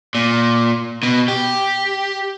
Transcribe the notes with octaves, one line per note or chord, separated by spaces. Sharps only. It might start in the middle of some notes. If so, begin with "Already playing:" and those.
A#2
B2
G4